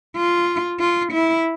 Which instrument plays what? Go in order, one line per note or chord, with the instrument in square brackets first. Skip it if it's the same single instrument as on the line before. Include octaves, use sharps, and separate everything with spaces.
[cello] F4
F4
E4